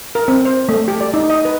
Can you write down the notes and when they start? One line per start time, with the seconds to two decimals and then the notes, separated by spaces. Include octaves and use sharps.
0.15 A#4
0.28 C4
0.45 C5
0.69 A3
0.88 G4
1.01 D5
1.14 D#4
1.30 D#5
1.45 B4